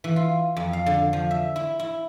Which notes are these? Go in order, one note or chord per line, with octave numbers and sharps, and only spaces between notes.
E3
F4
F2
F5
D3
F3
E5
E4
E4